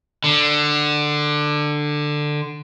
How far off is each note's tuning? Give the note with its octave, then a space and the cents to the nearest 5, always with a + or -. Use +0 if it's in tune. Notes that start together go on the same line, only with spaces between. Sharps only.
D3 +15